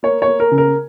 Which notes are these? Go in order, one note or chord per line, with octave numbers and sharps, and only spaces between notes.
A#3 C#5
C#5
A#3
A#4
C#3
A#4